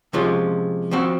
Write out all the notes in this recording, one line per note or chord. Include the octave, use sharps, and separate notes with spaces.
C3 F3 G#3 C#4 F4
F3 C4 F#4